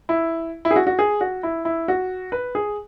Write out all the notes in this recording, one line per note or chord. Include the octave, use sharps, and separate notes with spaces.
E4
E4
G#4
F#4
F#4
G#4
F#4
E4
E4
F#4
B4
G#4